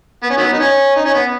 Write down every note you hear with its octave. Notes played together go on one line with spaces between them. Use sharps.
B3
C#4
D#3 F#3 B3
D#4
C#4
D#4
C#4
B3